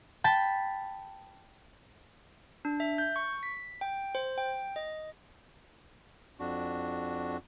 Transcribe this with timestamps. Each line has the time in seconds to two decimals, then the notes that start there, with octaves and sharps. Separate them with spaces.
0.24 G5 A5 B5
2.65 D4
2.80 E5
2.98 G6
3.16 C#6
3.43 B6
3.81 G5
4.15 C5
4.38 G5
4.76 D#5
6.40 F2 D4 F#4